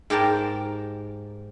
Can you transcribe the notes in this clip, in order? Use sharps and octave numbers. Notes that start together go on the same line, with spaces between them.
G#2 G4 A#4 G5 A5